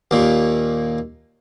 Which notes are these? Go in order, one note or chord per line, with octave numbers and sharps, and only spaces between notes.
D#2 A#2